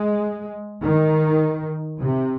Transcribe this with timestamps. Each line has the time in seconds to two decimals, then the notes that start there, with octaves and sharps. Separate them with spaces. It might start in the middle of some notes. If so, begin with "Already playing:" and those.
Already playing: G#3
0.82 D#3
2.00 C3